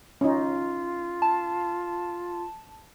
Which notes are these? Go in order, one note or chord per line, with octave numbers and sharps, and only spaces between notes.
C#4 D#4 F4
A5